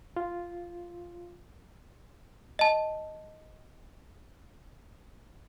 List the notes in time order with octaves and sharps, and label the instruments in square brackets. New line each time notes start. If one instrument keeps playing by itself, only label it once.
[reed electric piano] F4
[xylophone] D#5 A5